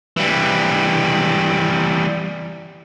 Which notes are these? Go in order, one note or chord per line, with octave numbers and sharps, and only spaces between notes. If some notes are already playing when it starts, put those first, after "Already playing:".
E3 G3